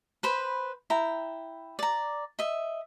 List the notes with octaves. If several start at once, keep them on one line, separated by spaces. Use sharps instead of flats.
B4 C5 B5
E4 G5 A#5
D5 A#5
D#5 E5